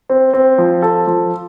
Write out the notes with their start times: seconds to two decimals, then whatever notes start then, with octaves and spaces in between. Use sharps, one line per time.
0.09 C4
0.33 C4
0.58 F3
0.82 A4
1.07 F3